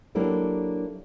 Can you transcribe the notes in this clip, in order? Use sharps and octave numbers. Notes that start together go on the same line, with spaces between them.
F#3 A#3 D4 E4 G4 A4